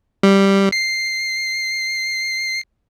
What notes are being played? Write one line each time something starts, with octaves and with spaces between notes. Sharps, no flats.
G3
C7